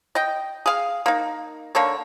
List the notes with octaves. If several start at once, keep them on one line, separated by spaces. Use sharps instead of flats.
D#5 G5
G#4 F5
A#3 D#4
D3 A#3 A4 C#5